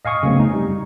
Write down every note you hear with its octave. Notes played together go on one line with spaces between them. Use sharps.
D#5 F5 G#5 C#6 D#6
C#3 F#3 A3 B3 C4
D#4
G3